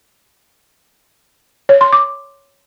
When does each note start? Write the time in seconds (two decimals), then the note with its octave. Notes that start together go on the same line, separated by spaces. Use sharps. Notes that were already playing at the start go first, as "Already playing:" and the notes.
1.69 C#5
1.81 C6
1.93 D6